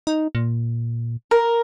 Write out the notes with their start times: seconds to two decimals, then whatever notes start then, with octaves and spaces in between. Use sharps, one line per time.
0.07 D#4
0.35 A#2
1.31 A#4